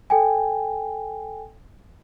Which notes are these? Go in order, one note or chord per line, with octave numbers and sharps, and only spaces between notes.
A4 G5 G#5